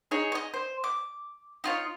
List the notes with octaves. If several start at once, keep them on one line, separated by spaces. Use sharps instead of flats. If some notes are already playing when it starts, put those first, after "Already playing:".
D#4 G#4 C#5
C#5 D#5
C5
D6
D#4 F4 C#5